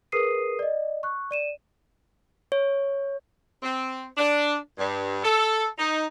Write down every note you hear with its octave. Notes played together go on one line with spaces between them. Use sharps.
G#4 A#4 B4 D#6 C7 D#7
D5 D#5
C#6 F#6
D5 D#7 E7
C#5
C4
D4
G2
A4
D#4